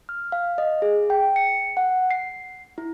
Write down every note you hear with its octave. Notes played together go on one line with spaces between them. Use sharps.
F6
F5
D#5
G#4
G5
C#7
F#5
C7
E4